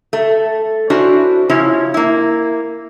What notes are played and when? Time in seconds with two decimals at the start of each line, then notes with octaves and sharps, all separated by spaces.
0.13 A3
0.90 C#4 D4 E4 F#4 C5
1.49 C#3 F3 C#4 E4
1.94 A#3 E4